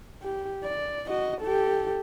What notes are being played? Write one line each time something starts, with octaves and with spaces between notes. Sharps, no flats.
G4
D5
F#4 D#5
G4 A4